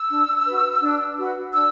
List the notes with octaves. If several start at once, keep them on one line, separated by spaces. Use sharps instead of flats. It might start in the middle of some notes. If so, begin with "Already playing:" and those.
Already playing: E6
D4
F#4 B4
D4
F#4 B4
D4 E6